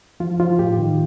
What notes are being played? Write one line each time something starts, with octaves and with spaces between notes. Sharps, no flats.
F3 F4
F3 F4
A2 G4
D#3